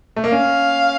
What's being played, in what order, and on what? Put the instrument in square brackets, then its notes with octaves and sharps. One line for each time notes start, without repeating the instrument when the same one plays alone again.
[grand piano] A3
A#3
[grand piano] C#4 [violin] F5